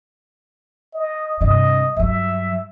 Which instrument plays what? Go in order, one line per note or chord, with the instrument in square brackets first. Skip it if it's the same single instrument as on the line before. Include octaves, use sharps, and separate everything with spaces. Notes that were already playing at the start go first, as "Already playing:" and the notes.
[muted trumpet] D#5
[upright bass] G2 C3 [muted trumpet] D#5
[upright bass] G2 F#3 [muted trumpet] E5